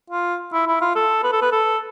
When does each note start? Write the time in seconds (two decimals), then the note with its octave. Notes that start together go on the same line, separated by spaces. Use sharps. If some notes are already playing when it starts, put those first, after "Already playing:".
0.10 F4
0.53 E4
0.67 E4
0.82 F4
0.95 A4
1.24 B4
1.32 A4
1.41 B4
1.52 A4